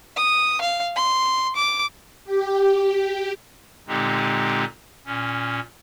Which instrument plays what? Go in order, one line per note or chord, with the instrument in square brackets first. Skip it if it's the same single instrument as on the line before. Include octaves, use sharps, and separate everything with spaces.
[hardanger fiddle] D#6
F5
C6
D6
[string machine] G4
[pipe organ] A#2 D3 G#3 C4 D#4 G4
A#2 C#4